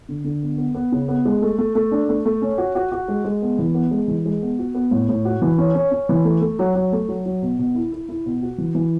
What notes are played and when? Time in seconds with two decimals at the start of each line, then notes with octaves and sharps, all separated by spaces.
0.09 D3
0.24 D3
0.42 B3
0.58 B3
0.75 B3
0.92 C#3
1.08 B3
1.25 G#3
1.42 A3
1.58 A3
1.75 A3
1.91 D4
2.09 A3
2.25 A3
2.42 C#4
2.58 F#4
2.75 F#4
2.92 F#4
3.08 G#3
3.24 G#3
3.42 B3
3.59 E3
3.74 B3
3.91 G#3
4.08 E3
4.26 G#3
4.42 B3
4.59 F#4
4.75 B3
4.91 A2
5.09 A2
5.25 F#4
5.42 E3
5.58 C#4
5.75 C#4
5.91 C#4
6.09 E3
6.25 A3
6.41 A3
6.59 F#3
6.75 F#3
6.92 A3
7.09 F#3
7.26 F#3
7.42 B2
7.59 B2
7.75 E4
7.92 E4
8.09 E4
8.26 B2
8.42 F#4
8.58 E3
8.75 E3